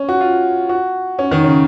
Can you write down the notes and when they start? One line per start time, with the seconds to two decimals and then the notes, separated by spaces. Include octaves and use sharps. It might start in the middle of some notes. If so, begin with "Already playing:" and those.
Already playing: C#4
0.09 F#4
0.21 F4
0.69 F#4
1.19 C#4
1.31 D#3
1.44 C#3